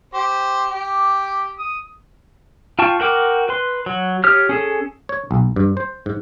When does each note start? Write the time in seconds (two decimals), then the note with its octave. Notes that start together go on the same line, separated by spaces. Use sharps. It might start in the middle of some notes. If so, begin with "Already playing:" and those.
0.14 G4 C5
0.71 G4 D6
1.59 D#6
2.79 F4 G5 A5 C#6
3.00 F#4 A#4 G5 D6
3.49 B4 C6
3.86 F#3
4.24 G4 C#5 D#6 F6
4.49 C#4 G#4 A4
5.09 C#5
5.31 B1
5.56 G2
5.77 C5
6.06 G#2